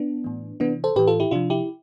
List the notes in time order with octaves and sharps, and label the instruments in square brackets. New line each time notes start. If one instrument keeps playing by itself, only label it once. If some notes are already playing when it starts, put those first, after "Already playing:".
Already playing: [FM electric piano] B3 D4
A2 E3
C3 E3 B3 D4
A4 C5
A2 E3 G4 B4
F4 A4
E4 G4
C3 F3 D4 F4
E4 G4